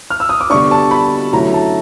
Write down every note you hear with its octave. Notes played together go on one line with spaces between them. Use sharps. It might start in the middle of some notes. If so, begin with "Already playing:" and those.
F6
E6
D#6
D6
D3 G3 B3 D4 C#6
A5
B5
D3 F#3 A3 C#4 E4 A#5
A5